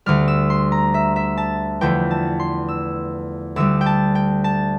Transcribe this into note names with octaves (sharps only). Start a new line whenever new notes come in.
D2 D3 G3 F6
E6
C6
A#5
E5
E5
A5
E2 D3 F3 A3 G5
A5
C6
E6
D2 D3 G3 E6
G5
A5
G5
A5